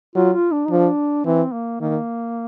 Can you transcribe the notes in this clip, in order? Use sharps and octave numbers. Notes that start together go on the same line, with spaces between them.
F#3 F4
F4
D4
D#4
F3 D4
E3 C4
A#3
D#3 A#3